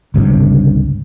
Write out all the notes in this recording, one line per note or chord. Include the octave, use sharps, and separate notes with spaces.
G1 C#2 G2 C3